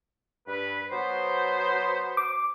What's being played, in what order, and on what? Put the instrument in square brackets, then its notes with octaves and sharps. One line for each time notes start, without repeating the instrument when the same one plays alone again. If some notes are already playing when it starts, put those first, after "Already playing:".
[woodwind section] G2 B4
F#3 B3 C5
[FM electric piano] D6